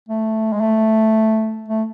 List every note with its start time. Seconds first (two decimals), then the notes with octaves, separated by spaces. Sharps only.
0.08 A3
0.53 G#3
0.60 A3
1.68 A3